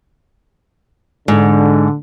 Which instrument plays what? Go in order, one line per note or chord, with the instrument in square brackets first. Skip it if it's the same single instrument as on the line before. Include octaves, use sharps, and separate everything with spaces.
[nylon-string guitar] G#2 [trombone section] D3